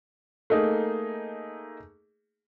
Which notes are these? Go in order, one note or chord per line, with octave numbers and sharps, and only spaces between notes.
A3 A#3 D#4 G#4